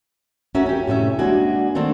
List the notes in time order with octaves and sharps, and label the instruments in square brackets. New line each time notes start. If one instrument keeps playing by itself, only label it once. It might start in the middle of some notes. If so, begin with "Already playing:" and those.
[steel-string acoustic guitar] A3 C#4 F#4 A#4 E5
C#4 G4
A2 C3 C#4 E5
G#3 A#3 D4 F#4 G#5
D#3 A3 A#3 C4 D4